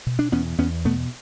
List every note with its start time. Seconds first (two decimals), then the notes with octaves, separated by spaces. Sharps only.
0.07 B2
0.19 D4
0.32 E2 B3 C#4
0.58 E2 B3 C#4
0.85 B2 A3 B3